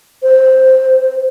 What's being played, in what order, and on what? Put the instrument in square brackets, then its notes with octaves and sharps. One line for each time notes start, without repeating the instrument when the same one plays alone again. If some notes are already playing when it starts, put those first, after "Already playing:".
[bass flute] C5